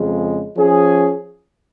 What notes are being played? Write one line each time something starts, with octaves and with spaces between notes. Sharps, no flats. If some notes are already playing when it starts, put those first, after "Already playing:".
Already playing: F2 C#3 G#3
F3 C#4 G#4